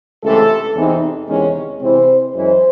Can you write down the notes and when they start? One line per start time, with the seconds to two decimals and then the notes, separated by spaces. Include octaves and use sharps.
0.23 C#2 C3 E3 A3 A4
0.76 E2 C3 E3 C4 D#4
1.29 E2 C3 D#3 G#3 C#4
1.81 C3 E3 G#3 C4 E4 C5
2.33 F#2 E3 G#3 C#4 E4 C5